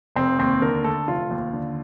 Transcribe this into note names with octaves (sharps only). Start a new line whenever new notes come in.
F1 C4
D#2 C4
D3 A#4
A3 A4
F1 F4
D#2
D3